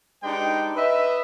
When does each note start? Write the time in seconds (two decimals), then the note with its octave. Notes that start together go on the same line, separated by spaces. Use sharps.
0.23 G#3 D4 D#4 G4 B4 G5
0.76 B4 D#5 E5